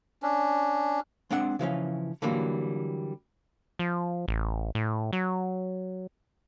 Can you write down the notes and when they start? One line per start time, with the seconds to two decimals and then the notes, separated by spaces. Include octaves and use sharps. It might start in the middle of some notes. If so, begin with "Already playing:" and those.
0.23 C#4 D4
1.31 G#3 C4 D4 F#5
1.59 C#3 E3 F3 C#4
2.22 D3 E3 F#3 G3 A#3
3.79 F3
4.28 A1
4.75 A2
5.13 F#3